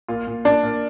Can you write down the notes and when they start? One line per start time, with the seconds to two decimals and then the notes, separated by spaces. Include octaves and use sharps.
0.08 A#2 F4
0.27 A#2
0.45 A#2 D4 D5
0.63 A#2